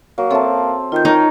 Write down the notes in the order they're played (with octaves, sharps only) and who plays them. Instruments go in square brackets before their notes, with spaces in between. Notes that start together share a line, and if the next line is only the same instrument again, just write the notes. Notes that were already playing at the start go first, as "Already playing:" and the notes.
[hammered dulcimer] F#3 [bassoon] A#3
[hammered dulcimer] C4 A5 [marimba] A4 C#5 E5
[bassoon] D#3 [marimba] F4 G6
[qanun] D#4 [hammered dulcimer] A#4 C#5 [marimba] D#5